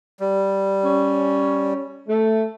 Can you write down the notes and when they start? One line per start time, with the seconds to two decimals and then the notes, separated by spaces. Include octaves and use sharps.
0.20 G3
0.84 C#4
2.09 A3